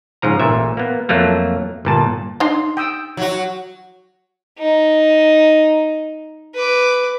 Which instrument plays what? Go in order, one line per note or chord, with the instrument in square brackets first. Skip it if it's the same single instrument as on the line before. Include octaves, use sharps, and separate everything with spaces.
[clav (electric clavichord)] G#2 C#3 F3 A#5
A1 A#2 E5
A#3 B3
F2 F#3 A3 A#3
G1 A#2 A5
[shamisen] D4 D#4 [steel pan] C6
[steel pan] G5 D#6 E6
[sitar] F#3 F#4
[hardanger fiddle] D#4
B4 D6